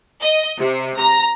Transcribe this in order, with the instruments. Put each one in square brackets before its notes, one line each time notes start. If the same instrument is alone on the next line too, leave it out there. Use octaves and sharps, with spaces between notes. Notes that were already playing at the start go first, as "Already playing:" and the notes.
[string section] D#5
C3
A#5